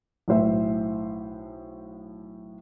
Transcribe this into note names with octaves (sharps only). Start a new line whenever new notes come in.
B1 A2 C5 E5